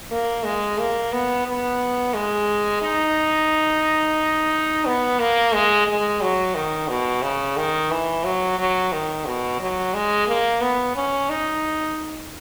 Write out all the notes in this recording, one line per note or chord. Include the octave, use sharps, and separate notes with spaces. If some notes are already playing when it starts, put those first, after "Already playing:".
A#3
G#3
A#3
B3
B3
G#3
D#4
B3
A#3
G#3
G#3
F#3
D#3
B2
C#3
D#3
E3
F#3
F#3
D#3
B2
F#3
G#3
A#3
B3
C#4
D#4